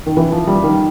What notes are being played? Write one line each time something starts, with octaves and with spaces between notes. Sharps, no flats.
D#3
E3
F3
G3
D#3